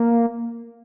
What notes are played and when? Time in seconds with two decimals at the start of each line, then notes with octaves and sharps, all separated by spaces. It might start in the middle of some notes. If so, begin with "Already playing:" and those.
Already playing: A#3